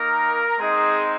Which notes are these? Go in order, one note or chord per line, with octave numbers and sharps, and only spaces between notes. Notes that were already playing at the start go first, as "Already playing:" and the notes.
Already playing: A#3 D#4 A#4
G#3 C4 D#4 G#4